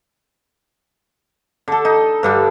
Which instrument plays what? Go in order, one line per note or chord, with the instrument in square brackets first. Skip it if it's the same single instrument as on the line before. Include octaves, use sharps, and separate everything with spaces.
[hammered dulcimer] D3 A4
D#4
G2 D3 G3